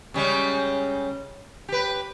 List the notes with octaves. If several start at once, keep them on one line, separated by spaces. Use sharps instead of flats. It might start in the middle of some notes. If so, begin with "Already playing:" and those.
C#3 G3 G#3
G4 B4